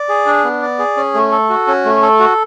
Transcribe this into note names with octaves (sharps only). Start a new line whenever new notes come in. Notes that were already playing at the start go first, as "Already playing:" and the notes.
Already playing: D5
G#4
D4
B3
D5
G#4
C#4
A3
A4
F#4
C#4
A3
A4
F#4